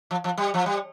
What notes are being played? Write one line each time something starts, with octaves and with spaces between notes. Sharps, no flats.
F3
F3
G3
F3
G3